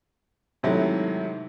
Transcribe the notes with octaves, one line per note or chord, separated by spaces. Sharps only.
G#2 C3 D#3 F#3 A3 E4